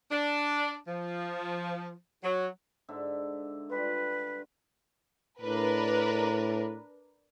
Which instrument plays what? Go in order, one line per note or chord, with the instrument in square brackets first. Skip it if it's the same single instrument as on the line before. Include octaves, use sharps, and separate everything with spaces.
[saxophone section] D4
F3
F#3
[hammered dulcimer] G#2 D3 E5
[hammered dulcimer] G3 F4 [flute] B4
[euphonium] A2 [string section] D4 A#4 B4